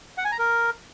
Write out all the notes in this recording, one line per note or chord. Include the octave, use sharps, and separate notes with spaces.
F#5
G#5
A#5
A#4